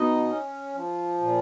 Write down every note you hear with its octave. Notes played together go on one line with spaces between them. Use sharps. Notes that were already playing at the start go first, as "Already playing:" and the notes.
Already playing: B2 D#4 D#5
C#4
F3
A#2